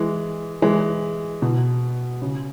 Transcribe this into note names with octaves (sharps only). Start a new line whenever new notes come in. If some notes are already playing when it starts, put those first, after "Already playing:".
Already playing: E3 G#3
E3 G#3
B2
C#3